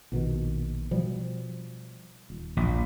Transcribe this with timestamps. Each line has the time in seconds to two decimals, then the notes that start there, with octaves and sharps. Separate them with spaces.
0.12 A#1 B2 D#3
0.91 B2 F3 G3
2.30 D#1
2.57 A#1